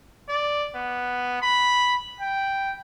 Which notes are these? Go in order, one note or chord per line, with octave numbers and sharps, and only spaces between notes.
D5
B3
B5
G5